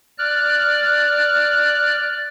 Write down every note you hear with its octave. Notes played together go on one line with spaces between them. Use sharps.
D5 F6 F#6